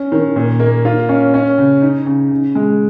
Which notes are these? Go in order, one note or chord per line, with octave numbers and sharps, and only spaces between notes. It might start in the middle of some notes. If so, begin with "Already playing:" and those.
Already playing: C#4
D#3
A#2
A#3
F4
C#4
C#4
C#3
D#4
C#3
C#3
G#3